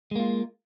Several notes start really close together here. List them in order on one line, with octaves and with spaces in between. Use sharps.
G#3 A#3 F4